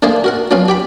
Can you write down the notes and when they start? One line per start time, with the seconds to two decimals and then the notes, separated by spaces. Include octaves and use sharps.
0.02 D3 A3 A#3 G#4 C5
0.24 F#4 A#4 F#5
0.51 F3 F#3 B3 C#4 F5
0.68 G4 G5 B5